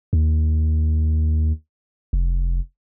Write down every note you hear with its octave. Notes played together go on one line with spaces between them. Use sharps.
D#2
F1